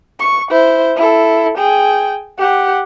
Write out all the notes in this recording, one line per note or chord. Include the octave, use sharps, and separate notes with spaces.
C#6
E4 C5
E4 A4
G#4 G5
G4 F#5